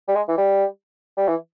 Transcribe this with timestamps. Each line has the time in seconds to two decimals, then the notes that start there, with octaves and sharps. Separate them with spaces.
0.08 G3
0.15 G#3
0.28 E3
0.38 G3
1.17 G3
1.28 E3